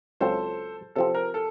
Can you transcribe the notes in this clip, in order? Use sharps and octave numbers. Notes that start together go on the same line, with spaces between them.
C#2 C#3 F#3 C4 F4 A4 C5
C3 F3 C4 A4
A#4
A4